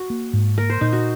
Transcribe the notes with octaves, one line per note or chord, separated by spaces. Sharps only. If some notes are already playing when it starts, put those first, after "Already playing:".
Already playing: F#4
A#3
G#2
A#3 A#4
C5
A#2 D#4
F#4